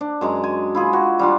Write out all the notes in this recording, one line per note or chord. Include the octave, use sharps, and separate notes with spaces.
D4
F#2 G#3 A#5
G#5
E4 F4 G#4
F#4
G3 D4 F4